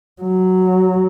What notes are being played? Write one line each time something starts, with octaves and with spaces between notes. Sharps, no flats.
F#3